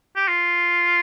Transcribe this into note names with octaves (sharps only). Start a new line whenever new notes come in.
G4
F4